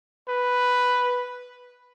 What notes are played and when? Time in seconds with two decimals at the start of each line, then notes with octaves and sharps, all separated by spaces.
0.29 B4